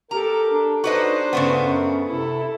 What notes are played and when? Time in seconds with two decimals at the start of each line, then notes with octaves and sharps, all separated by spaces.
0.11 G4 A4 A#4 A#5
0.50 D4
0.84 D4 D#4 F#4 B4 C5 D#5
1.33 G2 C#3 A3 B3
1.63 F#2
2.07 C3 E4 A4